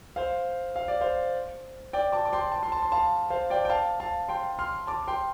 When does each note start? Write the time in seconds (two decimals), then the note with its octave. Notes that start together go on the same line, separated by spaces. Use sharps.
0.16 C5 F5
0.76 F5
0.88 D5
1.01 C5 F5
1.93 D5 G5
2.12 A5 D6
2.25 D6
2.32 G5 C6
2.52 A5
2.63 C6
2.72 A5
2.82 C6
2.92 F5 A5
3.30 C5 F5
3.50 D5 G5
3.65 G5
3.70 F5 A5
4.00 F5 A5
4.28 G5 C6
4.59 C6 F6
4.87 A5 D6
5.08 G5 C6